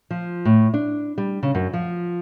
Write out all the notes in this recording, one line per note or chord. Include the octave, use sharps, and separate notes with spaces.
F3
A2
D4
G3
C#3
F#2
F3